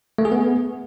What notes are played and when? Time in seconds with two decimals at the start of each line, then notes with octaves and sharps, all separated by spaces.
0.18 A3
0.25 G#4
0.32 B3